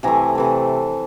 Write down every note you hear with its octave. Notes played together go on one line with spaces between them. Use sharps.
C3 E3 A3 G#5 A#5
C3 E3 A3